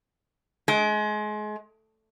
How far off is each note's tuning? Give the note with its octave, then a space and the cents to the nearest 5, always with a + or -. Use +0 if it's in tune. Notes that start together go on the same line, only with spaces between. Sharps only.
G#3 +30